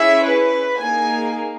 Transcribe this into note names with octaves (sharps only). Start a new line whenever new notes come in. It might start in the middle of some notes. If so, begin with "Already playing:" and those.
Already playing: C#4 E4 G#4 E5
B4
A#3 D#4 G#4 G#5